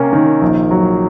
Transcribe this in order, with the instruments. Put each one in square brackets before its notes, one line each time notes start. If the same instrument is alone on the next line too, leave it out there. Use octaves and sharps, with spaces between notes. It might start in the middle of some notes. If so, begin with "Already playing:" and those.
Already playing: [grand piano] C3 A#3 C#4
D#3
A#1
F#3